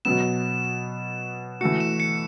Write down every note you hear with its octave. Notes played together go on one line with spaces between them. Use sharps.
B2 F#3 B3 E7
E3 A3 F#4 C#7
E7
C#7